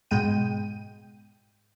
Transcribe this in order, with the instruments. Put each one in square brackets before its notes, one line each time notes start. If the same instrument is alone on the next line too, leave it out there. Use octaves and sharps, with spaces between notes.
[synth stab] G#2 B2 G#3 G5 D#7